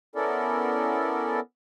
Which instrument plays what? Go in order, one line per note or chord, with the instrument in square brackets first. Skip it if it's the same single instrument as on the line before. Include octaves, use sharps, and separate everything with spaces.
[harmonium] B3 C#4 E4 A4 A#4 D5